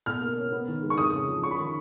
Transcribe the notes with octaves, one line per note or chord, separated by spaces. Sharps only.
B2 F6
A#3
C#4
B3
D#3
G#3
C#6
F2 D#6
C#3
F3
C#4 C#6
B5
D#3 C#6